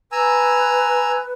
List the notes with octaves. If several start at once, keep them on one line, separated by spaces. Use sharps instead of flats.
B4 G#5 A#5 E6